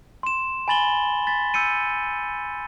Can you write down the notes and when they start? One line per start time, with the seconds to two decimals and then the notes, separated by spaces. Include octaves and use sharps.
0.23 C6 E7
0.68 G#5 B5 A6 F#7 G7
1.27 A6 B6
1.54 E6 G6 C#7 D#7